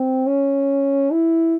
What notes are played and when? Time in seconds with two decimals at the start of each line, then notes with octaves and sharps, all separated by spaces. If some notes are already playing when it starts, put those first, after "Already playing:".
Already playing: C4
0.27 C#4
1.11 E4